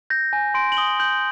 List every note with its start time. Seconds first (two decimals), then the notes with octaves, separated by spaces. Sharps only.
0.10 G6 A#6
0.33 G#5
0.54 C6 D7
0.72 F#7
0.77 D#6 G7
1.00 G6 F#7